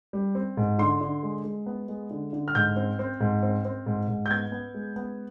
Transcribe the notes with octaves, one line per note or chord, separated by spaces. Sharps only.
G3
C4
G#2
D3 C6
D3
G#3
G#3
B3
G#3
D3
D3
F6
G#2 G6
C4
C4
G#2
C4
C4
G#2
G#2
G6
B3 G#6
B3
G#3
B3